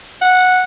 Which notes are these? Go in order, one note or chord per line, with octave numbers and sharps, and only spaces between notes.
F#5